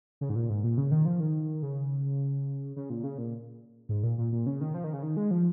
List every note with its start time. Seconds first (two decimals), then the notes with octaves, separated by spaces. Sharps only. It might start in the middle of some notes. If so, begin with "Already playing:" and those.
0.21 C#3
0.29 G#2
0.35 A#2
0.49 G#2
0.64 A#2
0.77 C#3
0.91 D#3
1.05 F3
1.20 D#3
1.62 C#3
2.76 C#3
2.90 A#2
3.04 C#3
3.18 A#2
3.89 G#2
4.03 A#2
4.18 A#2
4.32 A#2
4.46 C#3
4.61 D#3
4.74 F3
4.84 D#3
4.93 C#3
5.03 D#3
5.17 G#3
5.31 F3